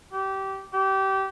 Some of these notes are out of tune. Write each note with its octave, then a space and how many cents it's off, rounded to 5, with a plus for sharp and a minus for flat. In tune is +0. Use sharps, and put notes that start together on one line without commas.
G4 -20
G4 -25